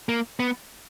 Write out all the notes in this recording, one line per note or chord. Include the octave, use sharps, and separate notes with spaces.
A#3
B3